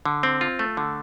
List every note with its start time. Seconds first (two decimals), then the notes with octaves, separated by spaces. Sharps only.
0.06 D3
0.23 C4
0.41 F4
0.59 A3
0.77 D3